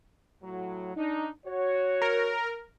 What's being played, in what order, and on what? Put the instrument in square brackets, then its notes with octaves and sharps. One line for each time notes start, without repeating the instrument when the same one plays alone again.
[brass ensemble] A2 F#3
D4 D#4
F#4 C#5
[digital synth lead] A#4